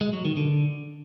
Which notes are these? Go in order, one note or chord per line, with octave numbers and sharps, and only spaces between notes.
G#3
F#3
D#3
D3